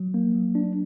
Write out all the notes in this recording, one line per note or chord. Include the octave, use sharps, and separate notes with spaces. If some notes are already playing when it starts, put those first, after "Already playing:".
Already playing: F#3
A#3
F#3
D4